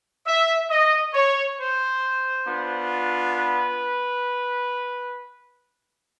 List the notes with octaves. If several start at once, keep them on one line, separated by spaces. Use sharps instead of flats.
E5
D#5
C#5
C5
B3 D4 F4
B4